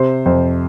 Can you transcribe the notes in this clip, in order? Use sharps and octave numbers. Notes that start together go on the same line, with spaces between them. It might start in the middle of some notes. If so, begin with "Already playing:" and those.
Already playing: C3 C5
F2 C5